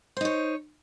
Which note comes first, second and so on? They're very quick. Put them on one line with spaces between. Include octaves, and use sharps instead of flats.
C5 D#4 C#5